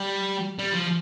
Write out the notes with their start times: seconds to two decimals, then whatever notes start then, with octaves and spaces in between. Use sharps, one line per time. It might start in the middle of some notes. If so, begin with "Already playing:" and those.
Already playing: G3
0.59 G3
0.73 F3